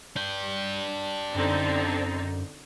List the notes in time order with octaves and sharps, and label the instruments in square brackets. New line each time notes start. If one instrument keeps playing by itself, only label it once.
[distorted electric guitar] D4 G5
[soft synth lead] F#2 [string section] D3 C4 D#4